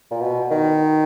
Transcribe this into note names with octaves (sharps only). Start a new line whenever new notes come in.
A#2
B2
D#3